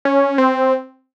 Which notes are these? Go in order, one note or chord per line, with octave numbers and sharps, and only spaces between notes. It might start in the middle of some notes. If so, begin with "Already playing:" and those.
C#4
C4